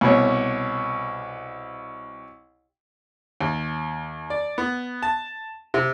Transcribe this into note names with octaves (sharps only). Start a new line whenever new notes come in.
C2 B2 C#5
D#2
D5
B3
A5
C3